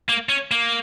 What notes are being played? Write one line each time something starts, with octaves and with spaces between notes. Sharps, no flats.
A#3
C#4
A#3